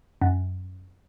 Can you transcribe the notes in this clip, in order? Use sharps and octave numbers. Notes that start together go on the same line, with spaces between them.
F#2